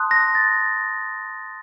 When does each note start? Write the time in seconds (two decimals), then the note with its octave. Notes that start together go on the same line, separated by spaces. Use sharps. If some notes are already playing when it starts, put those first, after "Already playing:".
Already playing: A5 C6 D#6 F#6
0.11 A#6
0.35 A6